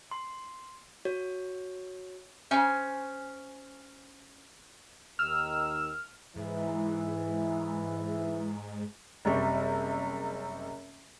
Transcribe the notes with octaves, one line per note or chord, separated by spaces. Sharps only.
C6
F#4 C#5
C#4 C5 G#5
D#2 D#3 E6 F6
G#2 E3
F#1 C3 G3 C#6